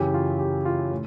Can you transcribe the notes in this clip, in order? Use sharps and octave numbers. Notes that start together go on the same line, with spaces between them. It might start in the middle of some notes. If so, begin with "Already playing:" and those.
Already playing: F#2 C#3 E3 G4
F4
G4
F4
A2